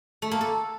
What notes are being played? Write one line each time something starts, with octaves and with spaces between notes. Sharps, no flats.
A3
A#3
A4